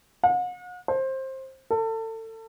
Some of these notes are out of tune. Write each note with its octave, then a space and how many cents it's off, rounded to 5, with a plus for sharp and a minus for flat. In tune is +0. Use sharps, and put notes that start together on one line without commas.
F#5 -45
C5 +20
A4 +30